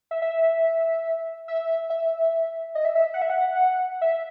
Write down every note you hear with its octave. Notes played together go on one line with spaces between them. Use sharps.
E5
E5
E5
E5
D#5
E5
E5
F#5
E5
F#5
E5